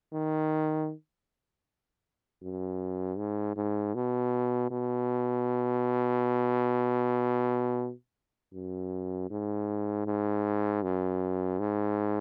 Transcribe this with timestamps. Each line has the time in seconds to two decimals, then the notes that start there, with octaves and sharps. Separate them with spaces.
0.13 D#3
2.42 F#2
3.18 G#2
3.56 G#2
3.95 B2
4.71 B2
8.53 F#2
9.31 G#2
10.06 G#2
10.83 F#2
11.59 G#2